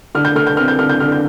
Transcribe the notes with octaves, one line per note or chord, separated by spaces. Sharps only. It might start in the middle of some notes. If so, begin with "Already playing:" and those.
D3 F6
G6
A3 F6
G6
C4 F6
G6
D3 F6
G6
D3 F6
G6